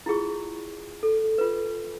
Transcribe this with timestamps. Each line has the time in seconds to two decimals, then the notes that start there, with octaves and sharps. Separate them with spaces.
0.06 E4 F4 G#4 C#6
1.03 A4
1.38 F4 B4